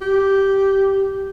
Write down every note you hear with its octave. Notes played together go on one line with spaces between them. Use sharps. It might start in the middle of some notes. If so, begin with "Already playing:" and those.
G4